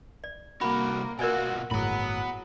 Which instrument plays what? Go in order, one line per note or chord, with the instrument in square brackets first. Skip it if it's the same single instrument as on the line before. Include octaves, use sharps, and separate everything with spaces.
[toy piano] D5
[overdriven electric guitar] C2 F#4 [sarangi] A#3 [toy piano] B5
[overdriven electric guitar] B2 F4 [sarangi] F#4 [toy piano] A#4 D5 G#5
[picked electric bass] G1 A2 [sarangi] F#3 [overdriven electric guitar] B3 B5 [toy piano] E4 G#4